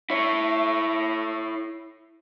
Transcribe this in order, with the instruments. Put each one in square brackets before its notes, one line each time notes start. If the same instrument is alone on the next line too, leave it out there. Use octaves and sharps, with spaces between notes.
[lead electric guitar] E4 C#5